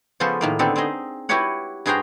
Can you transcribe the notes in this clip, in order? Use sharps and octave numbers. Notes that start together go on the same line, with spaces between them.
C#3 F3 B3 C#4 A4 C5
A2 D#3 A#3
D3 B3 C4 G4 A4
C4 D#4 G#4 D#5
E4 F#4 G4 B4 C#5 F#5
G2 F#4 G#4 C5 G5 A#5